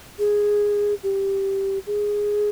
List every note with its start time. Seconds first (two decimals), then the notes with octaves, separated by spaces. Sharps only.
0.19 G#4
1.03 G4
1.87 G#4